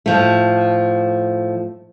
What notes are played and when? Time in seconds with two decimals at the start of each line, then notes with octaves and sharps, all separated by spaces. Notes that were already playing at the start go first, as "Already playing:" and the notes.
0.06 A2 F3 A3